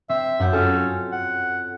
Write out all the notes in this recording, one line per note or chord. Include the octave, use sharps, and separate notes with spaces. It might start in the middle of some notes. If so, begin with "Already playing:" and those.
C4 E5
F#2 F#5 G6
C#4 F4 A4
F#5